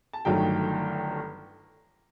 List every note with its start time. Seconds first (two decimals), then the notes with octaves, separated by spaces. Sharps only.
0.13 A5
0.25 G1 G2 D#3 F#3 A3 G5